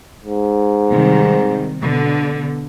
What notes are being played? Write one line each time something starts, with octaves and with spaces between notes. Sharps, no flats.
G#2
C3 D#3 G3
B2 D3 B3